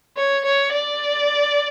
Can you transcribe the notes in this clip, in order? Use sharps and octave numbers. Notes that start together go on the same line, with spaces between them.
C#5
C#5
D5